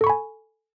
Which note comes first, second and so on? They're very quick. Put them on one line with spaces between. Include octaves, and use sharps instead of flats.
A4 C#6 B5 G#5